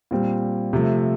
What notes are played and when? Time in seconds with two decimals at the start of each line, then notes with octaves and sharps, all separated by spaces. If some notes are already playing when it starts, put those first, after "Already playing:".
0.11 A#2 G3 C4
0.73 C3 F3 A3